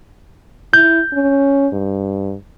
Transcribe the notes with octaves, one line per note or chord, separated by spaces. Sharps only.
E4 G6
C#4
G2